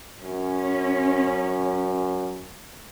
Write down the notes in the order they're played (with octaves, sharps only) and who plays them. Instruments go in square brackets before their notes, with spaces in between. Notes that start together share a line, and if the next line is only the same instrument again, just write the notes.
[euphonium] F#2 [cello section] C#4